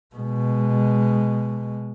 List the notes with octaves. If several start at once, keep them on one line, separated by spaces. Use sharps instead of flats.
B2 G#3